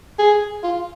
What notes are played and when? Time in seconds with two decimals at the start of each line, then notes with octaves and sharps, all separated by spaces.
0.19 G#4
0.63 F4